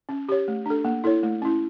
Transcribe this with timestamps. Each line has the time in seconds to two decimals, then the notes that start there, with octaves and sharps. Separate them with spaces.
0.09 C#4
0.29 G4 C#5
0.48 A3
0.66 D4 A4
0.85 A#3
1.04 E4 A4 C#5
1.23 A3
1.42 C#4 E4